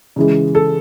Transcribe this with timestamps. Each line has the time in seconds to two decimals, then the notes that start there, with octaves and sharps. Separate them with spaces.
0.16 C#3 E3 G#3
0.55 A4